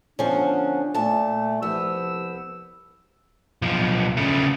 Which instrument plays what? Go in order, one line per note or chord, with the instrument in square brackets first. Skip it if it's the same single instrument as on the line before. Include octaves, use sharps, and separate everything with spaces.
[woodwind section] D3 B3 D4 [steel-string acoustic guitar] F3 C#4
[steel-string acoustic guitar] A#2 A5 [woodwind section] A3
[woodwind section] C2 F3 E6 [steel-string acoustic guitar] B3
[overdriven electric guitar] B1 F3
C#3 A3